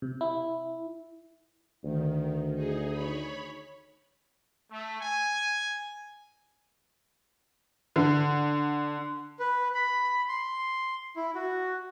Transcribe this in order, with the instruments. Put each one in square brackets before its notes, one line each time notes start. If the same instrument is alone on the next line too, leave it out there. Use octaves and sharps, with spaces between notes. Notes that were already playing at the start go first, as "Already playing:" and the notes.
[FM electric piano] C3
E4
[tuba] D2 [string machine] D#3
[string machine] D#4 G#4
C#5 B5
[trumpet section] A3
G#5
[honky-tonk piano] D3
[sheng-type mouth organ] B4
B5
C6
E4
F#4